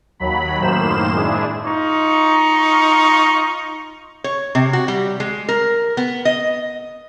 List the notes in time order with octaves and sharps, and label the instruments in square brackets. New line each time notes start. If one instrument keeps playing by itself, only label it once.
[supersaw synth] D#2 F#3 B5
F#2 A2 D#3 A#3 C5 E7
G#3 D4 E4 G#4
[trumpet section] D#4 F4 C#6
[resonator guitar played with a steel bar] C#5
C3
F#4
G3
G#3
A#4
B3
D#5